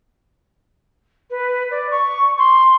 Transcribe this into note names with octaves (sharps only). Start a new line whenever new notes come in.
B4
D5
C#6
C6